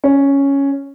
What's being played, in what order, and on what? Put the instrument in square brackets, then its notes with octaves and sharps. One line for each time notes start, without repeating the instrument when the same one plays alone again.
[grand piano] C#4